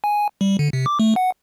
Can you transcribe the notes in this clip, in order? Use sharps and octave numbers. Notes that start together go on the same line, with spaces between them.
G#5
G3
D3
C3
D6
A3
F#5